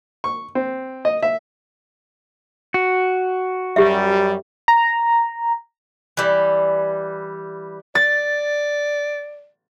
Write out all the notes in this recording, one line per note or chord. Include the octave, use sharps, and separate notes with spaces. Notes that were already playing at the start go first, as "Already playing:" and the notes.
C#6
C4
D#5
E5
F#4
F#2 G3 G4 E5
A#5
E3 G3
D5 A6